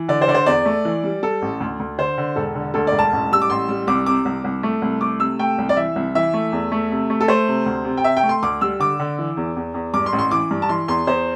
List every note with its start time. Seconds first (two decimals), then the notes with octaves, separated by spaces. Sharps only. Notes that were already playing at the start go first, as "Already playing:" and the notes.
Already playing: E3
0.08 D3 D5
0.22 C5
0.28 D3 D5
0.34 C5
0.46 E2 D5
0.65 A3
0.85 E3
1.04 G3
1.23 G3 A4
1.42 A1
1.60 D2
1.80 D2
1.98 D3 C5
2.18 D3
2.36 E1 A4
2.55 D3
2.74 D2 A4
2.87 D5
2.92 E1
2.99 A5
3.12 A1
3.31 G3 E6
3.42 D6
3.50 A1 C6
3.68 G3
3.87 C2 D6
4.06 C3 D6
4.25 C2
4.44 C2
4.63 A3
4.82 C2
5.01 A3 D6
5.20 C3 E6
5.39 A3 G5
5.58 C2
5.69 D5
5.77 E3 E5
5.96 C2
6.15 E3 E5
6.34 A3
6.52 E2
6.72 A3
6.91 C3
7.10 A3
7.21 A4
7.28 A3 C5
7.48 C3
7.66 D2
7.85 C3
7.97 G5
8.04 C3 E5
8.17 G5
8.23 A3
8.29 C6
8.43 D2 D6
8.61 G3 E6
8.80 D3 D6
8.99 D3
9.18 E3
9.37 E2
9.56 E2
9.74 E2
9.94 G2 D6
10.06 C6
10.12 A1
10.19 C6
10.31 E3 D6
10.51 G2
10.62 A5
10.69 E3 C6
10.88 E2 C6
11.07 E2 C5